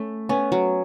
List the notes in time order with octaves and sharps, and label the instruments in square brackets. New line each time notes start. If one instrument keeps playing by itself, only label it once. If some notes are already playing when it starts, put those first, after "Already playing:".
Already playing: [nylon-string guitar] A3 [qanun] C#4
[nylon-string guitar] B3 [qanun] C#4
[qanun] F#3